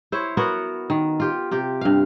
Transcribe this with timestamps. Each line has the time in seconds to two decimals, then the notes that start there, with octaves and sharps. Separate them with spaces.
0.12 E4 C5 C#5
0.37 B3 F#4 A#4 C#5
0.90 D#3
1.20 F4 G4
1.51 C3 G4
1.81 G2 F5